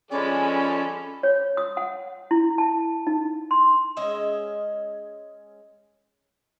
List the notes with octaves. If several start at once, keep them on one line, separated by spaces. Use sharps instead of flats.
F3 G#3 C#4 A4 D5 B5
C#5
D#6
F#5
E4
A5
D#4
C6
G#3 C#4 D#5 E5